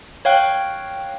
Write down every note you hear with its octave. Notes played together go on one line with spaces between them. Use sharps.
C#5 F5 G5 F#6